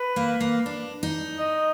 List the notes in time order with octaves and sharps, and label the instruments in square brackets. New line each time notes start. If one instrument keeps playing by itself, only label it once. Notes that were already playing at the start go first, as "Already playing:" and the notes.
Already playing: [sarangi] B4
[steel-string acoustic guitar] A#3
A#3
D4
D#4
[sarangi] D#5